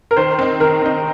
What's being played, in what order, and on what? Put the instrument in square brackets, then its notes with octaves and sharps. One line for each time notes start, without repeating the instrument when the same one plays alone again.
[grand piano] A#4
[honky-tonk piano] D#3 [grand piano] C5
[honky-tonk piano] C4 D#4
[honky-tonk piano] D#3 [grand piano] A#4
[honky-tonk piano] C4 D#4